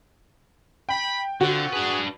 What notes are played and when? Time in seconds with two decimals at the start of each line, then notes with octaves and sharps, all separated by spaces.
0.89 G5 B5
1.41 D3 C4 F4 F#4
1.73 D4 G#4 B4